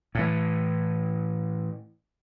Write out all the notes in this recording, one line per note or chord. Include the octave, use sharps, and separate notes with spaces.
A2 E3